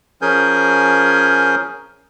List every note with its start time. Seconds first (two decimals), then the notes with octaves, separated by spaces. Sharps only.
0.22 F3 C#4 G#4 A#4 G#5 G6